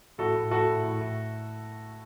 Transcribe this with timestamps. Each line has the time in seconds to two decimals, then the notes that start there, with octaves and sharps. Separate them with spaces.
0.18 A2 F#4 A4
0.35 A2
0.51 A2 F#4 A4
0.67 A2
0.83 A2
1.01 A2